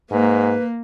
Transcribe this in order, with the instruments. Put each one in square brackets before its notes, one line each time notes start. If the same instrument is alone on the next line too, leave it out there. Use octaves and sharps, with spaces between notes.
[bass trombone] G#2 [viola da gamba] A#3 [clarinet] B4